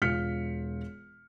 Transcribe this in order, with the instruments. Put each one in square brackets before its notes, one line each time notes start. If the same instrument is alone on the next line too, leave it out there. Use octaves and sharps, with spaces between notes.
[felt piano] E1 F4 F6 B6 C#7